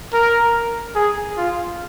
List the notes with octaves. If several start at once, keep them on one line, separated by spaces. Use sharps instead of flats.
A#4
G#4
F4